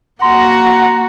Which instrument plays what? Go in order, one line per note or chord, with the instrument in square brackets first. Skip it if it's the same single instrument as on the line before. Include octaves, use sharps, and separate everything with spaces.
[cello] A#3 F#4 [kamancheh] F#5 [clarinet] A#5 [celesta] C6